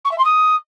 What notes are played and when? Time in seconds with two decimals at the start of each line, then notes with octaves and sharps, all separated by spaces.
0.05 C#6
0.12 E5
0.18 C6
0.25 D#6